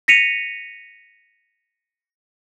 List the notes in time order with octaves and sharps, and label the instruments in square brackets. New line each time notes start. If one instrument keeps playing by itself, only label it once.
[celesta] A#6 B6 C#7 D#7 F7